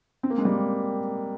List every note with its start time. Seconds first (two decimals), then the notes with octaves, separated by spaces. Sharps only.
0.23 C4
0.30 A#3
0.38 G#3
0.45 G3 A#3